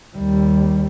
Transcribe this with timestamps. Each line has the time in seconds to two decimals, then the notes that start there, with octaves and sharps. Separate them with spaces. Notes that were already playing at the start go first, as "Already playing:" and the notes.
0.16 D#2 G3